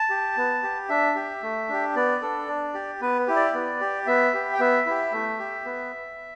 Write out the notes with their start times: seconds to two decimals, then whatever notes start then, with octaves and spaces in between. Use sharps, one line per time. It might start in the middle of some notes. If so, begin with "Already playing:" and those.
Already playing: A5
0.10 G4
0.37 B3
0.63 G4
0.89 D4 E5
1.15 G4
1.43 A3
1.69 D4 G4
1.96 B3 D5
2.22 D4 A4
2.48 D4
2.74 G4
3.01 B3 B4
3.28 E4 G4
3.36 D5
3.54 B3
3.81 G4
4.07 B3 E5
4.34 G4
4.53 G5
4.60 B3 E5
4.86 E4 G4
5.12 A3
5.39 G4
5.65 B3